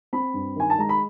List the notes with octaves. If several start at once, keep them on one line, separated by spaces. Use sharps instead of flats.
C4 B5
G2
D#3 G#5
A5
G#3 A#5
B5